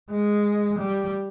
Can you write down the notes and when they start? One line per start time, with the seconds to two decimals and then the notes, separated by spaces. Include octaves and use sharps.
0.11 G#3
0.78 G3